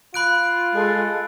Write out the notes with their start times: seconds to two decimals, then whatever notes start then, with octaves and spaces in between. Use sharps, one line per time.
0.14 F4 B5 F#6 D7
0.75 G#3 A4